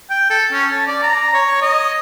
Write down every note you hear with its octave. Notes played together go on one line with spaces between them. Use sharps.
G5
A4
C#4
A5
D5
A#5
C#5
D#5